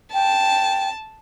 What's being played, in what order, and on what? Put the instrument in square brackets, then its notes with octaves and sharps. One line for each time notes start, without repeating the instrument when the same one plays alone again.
[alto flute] G5 [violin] A5